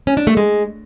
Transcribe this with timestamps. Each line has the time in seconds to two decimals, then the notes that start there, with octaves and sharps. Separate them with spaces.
0.07 C#4
0.17 D4
0.27 A3
0.37 G#3